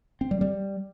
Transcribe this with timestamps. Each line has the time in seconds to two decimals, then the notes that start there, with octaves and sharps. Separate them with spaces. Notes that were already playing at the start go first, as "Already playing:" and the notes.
0.21 C4
0.31 G3
0.41 G3